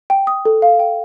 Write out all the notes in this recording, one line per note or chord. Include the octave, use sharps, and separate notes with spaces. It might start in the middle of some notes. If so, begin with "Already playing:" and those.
G5
D#6
A4
F5
G5